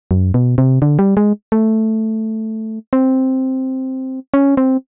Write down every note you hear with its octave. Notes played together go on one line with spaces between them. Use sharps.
F#2
B2
C3
D3
G3
G#3
A3
C4
C#4
C4